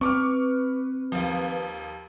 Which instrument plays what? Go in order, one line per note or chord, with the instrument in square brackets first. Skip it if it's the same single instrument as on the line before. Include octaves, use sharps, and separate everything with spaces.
[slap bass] C4 [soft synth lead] B4 [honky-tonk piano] C#6 D6 F6
[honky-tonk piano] D#2 F3